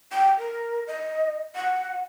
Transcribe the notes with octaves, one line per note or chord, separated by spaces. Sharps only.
G5
A#4
D#5
F#5